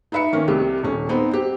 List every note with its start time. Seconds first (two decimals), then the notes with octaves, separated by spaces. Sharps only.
0.12 D#4 B4 E5 B5 C#7
0.33 D#3 A#3 C#4
0.48 C2 C3 A3 G4
0.83 D#1 C#4
1.09 B3 C4 D#4
1.31 C4 G4